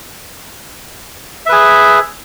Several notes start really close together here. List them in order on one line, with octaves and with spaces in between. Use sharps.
E5 B4 G#4